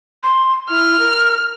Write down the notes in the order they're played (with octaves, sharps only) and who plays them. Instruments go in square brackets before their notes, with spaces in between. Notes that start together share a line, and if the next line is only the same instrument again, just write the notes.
[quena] C6
[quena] E4 [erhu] F6
[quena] A#4